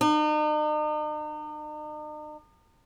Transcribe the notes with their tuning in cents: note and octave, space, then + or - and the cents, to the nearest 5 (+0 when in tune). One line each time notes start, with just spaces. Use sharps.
D#4 -45